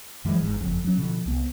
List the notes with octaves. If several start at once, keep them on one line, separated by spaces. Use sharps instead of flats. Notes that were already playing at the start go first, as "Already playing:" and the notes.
F#2 E3 F3 G#3
G1 G#2
F#1 F2
F#3 C#4
B2 D3 F3
C2 B3